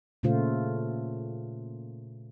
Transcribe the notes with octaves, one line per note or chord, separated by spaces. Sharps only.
A#2 C#3 A3 F4 C5